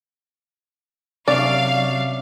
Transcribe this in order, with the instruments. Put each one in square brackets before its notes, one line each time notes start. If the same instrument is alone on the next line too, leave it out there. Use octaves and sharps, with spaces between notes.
[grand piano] C3 [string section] F#3 F5 [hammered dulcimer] C#4 D4 E5 [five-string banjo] D5